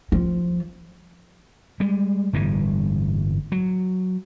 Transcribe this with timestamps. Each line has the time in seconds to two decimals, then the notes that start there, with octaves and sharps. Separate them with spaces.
0.12 F3
1.80 G3 G#3
2.33 G1 A2 E3 G3
3.52 F#3